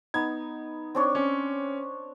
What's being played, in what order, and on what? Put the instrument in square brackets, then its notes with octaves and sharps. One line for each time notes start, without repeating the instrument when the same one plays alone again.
[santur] B3 D#4 [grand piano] G#6
[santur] C4 D4 C#5
[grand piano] C#4